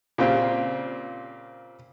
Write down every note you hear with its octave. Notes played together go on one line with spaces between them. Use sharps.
A#2 C#3 C4 F4 G4